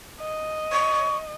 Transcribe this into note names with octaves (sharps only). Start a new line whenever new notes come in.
D#5
C#6